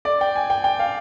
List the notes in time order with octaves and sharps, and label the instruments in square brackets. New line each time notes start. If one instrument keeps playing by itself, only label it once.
[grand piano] D5
G5
G#5
G5
G5
F5